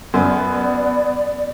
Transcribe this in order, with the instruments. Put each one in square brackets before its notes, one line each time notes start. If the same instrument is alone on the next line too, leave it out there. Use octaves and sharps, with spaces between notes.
[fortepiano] F#2 [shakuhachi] B3 [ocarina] D5